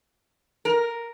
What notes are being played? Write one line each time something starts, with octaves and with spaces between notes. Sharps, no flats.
A#4